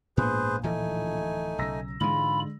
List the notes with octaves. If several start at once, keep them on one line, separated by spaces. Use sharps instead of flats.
A#1 G#2 B3 G#4 B4 C5
D1 E3 F3 A3 D#4 G#5
B1 C#3 A#5 E6 A#6
G#2 D3 E3 G#3 F4 B5